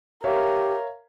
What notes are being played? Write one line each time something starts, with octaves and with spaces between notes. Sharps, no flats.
G4 A#4 C#5 E5 F5